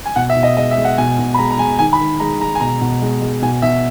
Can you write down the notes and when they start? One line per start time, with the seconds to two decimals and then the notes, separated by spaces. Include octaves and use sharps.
0.05 G#5
0.16 B2 F#5
0.30 E5
0.36 B2
0.43 D#5
0.57 G#3 D#5
0.71 E5
0.77 G#3
0.85 F#5
0.98 B2 G#5
1.19 B2
1.34 B5
1.39 G#3 A#5
1.51 A#5
1.59 G#3 G#5
1.79 D#3 G#5
1.93 B5
2.00 D#3
2.20 G#3 A#5
2.40 G#3 A#5
2.55 G#5
2.60 B2 A#5
2.81 B2
3.02 G#3
3.22 G#3
3.42 B2 G#5
3.62 B2 E5